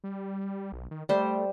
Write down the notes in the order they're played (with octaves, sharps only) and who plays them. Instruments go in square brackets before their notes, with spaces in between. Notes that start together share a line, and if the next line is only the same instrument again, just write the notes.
[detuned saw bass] G3
B1
D#3
[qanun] G3 C5 [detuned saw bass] A3